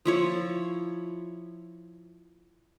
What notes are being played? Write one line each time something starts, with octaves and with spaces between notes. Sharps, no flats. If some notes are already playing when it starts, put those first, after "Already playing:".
F3 E4 C#5